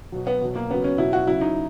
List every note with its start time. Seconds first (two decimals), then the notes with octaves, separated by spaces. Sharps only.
0.12 B2 F#3
0.27 B3
0.41 B2 F#3
0.56 A#3
0.70 C#3 F#3 B3
0.84 C#4
0.98 B2 F#3 E4
1.13 F#4
1.27 C#3 F#3 E4
1.41 D#4